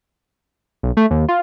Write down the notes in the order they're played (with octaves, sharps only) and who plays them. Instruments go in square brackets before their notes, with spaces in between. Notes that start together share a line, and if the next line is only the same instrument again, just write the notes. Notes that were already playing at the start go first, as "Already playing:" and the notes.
[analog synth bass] B1
A3
D#2
F4